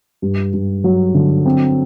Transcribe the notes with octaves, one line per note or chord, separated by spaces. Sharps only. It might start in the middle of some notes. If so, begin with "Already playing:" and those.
G2
G2
F#3
D3
C4